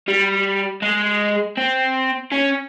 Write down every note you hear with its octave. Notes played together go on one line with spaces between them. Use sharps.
G3
G#3
C4
C#4